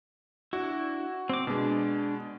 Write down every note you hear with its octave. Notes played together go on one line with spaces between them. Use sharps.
D4 E4 F#4
C4 D6
B2 G#3 D4